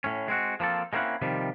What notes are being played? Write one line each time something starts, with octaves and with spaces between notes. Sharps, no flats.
A2 C#4
G#3 C4 F#4
F3 A#3 C4 A4
G#3 A#3 C4 C#4 E4 F#5
C3 D#3 F3 G3